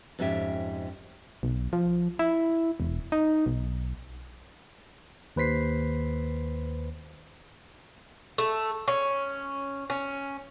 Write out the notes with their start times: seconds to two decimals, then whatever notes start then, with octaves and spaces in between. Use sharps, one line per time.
0.19 F2 G#2 C#4 G4 E5
1.43 B1
1.73 F3
2.19 E4
2.80 E1
3.12 D#4
3.46 B1
5.36 D#2 B4 C5 B6 C7
8.38 A3
8.88 C#4
9.90 C#4